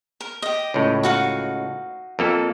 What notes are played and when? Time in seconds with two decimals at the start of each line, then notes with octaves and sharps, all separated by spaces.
0.21 A#4
0.42 G4 D#5
0.74 C#2 A2
1.03 D#4 F#4 F5
2.19 F2 A#3 A4